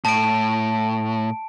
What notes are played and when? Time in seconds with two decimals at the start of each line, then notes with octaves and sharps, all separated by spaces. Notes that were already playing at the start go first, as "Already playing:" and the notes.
0.05 A2 A5 D7